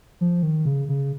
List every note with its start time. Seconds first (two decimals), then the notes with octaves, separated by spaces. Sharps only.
0.21 F3
0.43 D#3
0.65 C#3
0.89 C#3